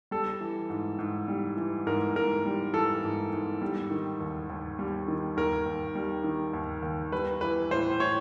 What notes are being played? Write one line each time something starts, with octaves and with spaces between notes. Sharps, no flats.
G3 A4
E3
G#2
G#2
G3
E3
G#2 A#4
G#2 A#4
G3
E3 A4
G#2
G#2
G3
D#3
D#2
D#2
G3
D#3
D#2 A#4
D#2
G3
D#3
D#2
D#2
G3 B4
E3 B4
A2 C5
A2 C#5